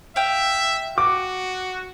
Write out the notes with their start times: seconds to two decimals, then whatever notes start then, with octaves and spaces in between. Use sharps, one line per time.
0.16 E5 F5 G5
0.98 F#4 D6